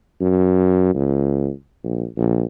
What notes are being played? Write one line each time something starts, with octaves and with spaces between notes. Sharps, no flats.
F#2
C#2
A#1
A#1